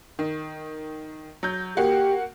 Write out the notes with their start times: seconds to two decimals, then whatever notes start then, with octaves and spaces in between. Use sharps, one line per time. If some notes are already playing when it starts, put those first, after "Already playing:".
0.19 D#3
1.43 F#3 G6
1.77 A#3 F#4 G4